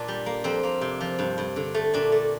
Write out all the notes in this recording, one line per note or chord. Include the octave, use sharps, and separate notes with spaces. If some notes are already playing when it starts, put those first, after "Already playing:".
Already playing: A#2 D4
G3
A#3
F2 C4
A#3
C3
F3
G2
G2
D3
A3
A#2 D4
A3